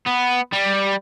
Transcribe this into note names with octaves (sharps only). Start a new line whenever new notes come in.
B3
G3